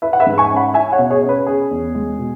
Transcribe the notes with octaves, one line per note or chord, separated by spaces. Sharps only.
E4 B4 E5
F#5
B4 E5
G#2
G#5 C#6
C#4
F#5 B5
E4 E5 G#5
C#5 F#5
B2
G#4 C#5
C#4
B4
C#4 G#4
E2
G#3
B2